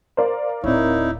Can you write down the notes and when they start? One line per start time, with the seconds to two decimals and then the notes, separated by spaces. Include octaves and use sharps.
0.17 A#4 C5 D5 F5
0.64 D1 C4 D#4 E4 C#5